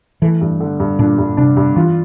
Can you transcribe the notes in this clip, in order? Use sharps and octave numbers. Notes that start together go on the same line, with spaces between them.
E3 A3
G2
D3
G2
A#2 D4
G2
C3 D4
G2
E3 F4